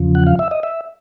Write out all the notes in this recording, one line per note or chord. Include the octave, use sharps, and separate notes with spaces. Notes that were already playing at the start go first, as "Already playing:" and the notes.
Already playing: E2 C#3 F3
F#5
F5
E5
D#5
E5